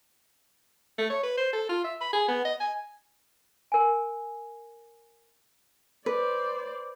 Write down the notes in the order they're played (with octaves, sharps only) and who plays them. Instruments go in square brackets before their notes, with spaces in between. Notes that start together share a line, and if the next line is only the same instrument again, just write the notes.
[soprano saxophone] A3
C#5
B4
C5
A4
F4
E5
B5
G#4
B3
D#5
G#5
[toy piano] A#4 G#5
[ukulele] B4 [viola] C5 D5